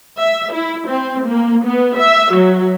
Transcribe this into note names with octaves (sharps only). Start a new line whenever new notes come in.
E5
E4
C4
A#3
B3
E5
F#3